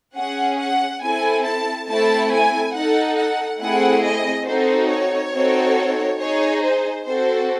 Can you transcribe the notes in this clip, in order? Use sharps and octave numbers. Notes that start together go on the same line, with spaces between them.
C#4 G#4 F#5
F#5
C4 E4 A4 G#5
A5
A3 C4 E4 A4 A5
G#5
D#4 A4 F#5
F#5
A3 C4 E4 G#4 F#5
D#5
C4 D#4 F#4 A4 C5
C#5
C4 D#4 F#4 A4
D#4 G#4 C#5
C5
C4 F#4 A4 C5